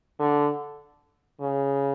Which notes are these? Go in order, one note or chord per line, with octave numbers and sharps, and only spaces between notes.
D3
C#3